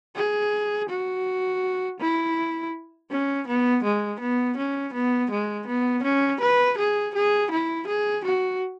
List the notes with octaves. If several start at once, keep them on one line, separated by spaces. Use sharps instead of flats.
G#4
F#4
E4
C#4
B3
G#3
B3
C#4
B3
G#3
B3
C#4
B4
G#4
G#4
E4
G#4
F#4